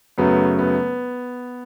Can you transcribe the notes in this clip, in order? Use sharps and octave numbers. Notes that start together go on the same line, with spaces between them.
F#2 C#3 F#3 A3 B3
B3